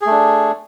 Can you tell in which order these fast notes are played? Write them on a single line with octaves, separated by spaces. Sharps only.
G#4 A3 D4